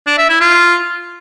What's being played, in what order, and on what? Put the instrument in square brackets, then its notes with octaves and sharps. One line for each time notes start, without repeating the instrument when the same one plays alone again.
[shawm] D4
E5
E4
F4